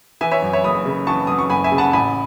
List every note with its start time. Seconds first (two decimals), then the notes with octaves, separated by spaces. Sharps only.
0.21 E3 E5 G#5
0.31 C#5 E5
0.42 F#2
0.53 C#5 E5
0.64 F#1 B5 D#6
0.86 C#3
1.07 E3 A5 C#6
1.27 F#2 D#6
1.39 C#6
1.49 F#1 G#5 B5
1.64 E5 G#5
1.72 C#3
1.78 F#5 A5
1.93 A1 G#5 B5